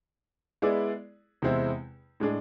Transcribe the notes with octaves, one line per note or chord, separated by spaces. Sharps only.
G#3 B3 E4 G#4 D5
E2 C3 G#3 C4 E4
A2 G#3 D4 G#4